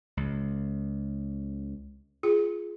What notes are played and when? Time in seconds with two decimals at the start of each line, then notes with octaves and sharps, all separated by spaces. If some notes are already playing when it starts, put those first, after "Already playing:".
0.17 C#2
2.23 F4 G#4